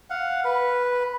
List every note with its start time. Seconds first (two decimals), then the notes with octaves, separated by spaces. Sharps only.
0.10 F5 F#5
0.45 B4